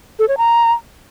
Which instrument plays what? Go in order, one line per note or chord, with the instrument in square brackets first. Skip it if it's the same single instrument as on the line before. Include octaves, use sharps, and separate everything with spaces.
[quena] A4
C#5
A#5